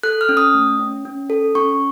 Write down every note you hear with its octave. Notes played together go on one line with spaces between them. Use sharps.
A4 F#6
F6
C#4
D#6
A3
C#4
C#4
A4
C#4 C#6